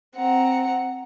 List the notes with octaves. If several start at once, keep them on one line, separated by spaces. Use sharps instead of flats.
C4 F#5 A#5